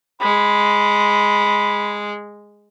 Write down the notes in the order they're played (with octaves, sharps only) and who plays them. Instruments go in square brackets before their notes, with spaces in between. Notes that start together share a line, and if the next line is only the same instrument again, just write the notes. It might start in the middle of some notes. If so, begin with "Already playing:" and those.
[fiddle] G#3 [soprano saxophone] B5